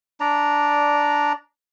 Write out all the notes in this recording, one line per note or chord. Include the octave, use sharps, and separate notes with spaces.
D4 D5 A#5